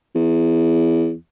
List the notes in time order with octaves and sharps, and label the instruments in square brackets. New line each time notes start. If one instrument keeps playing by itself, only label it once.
[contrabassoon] E2